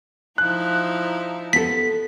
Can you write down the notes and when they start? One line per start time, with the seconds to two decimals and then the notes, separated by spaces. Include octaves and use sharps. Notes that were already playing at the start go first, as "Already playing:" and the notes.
0.38 F3 D#4 E4 F#6
1.53 B3 A4 B6